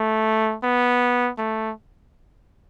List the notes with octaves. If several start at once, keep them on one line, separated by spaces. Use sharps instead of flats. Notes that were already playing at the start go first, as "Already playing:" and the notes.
Already playing: A3
B3
A3